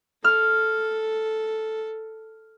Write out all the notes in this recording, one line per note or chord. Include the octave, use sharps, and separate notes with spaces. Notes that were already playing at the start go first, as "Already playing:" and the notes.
A4 F6